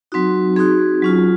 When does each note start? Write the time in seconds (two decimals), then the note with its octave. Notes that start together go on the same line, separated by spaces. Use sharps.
0.12 F#3 C4 D#4 F#4
0.56 C4 D#4 F#4 G#4
1.02 F#3 C#4 F4